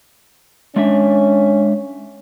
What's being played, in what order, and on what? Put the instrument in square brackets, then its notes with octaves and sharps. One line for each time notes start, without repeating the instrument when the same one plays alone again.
[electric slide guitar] G#3 D4 E5 [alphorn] C#4